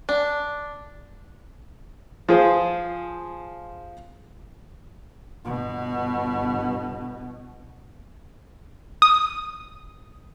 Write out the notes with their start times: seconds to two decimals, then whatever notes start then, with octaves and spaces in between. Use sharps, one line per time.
0.09 D4
2.29 F3 G#4 C5
5.45 G1 B2
9.02 D#6